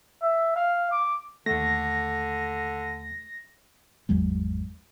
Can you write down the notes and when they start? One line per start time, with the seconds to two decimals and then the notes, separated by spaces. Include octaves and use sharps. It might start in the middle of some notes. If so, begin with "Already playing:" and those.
0.22 E5
0.56 F5
0.91 D6
1.46 D#2 D3 A3 A#6
4.09 G#1 E2 F#3 G#3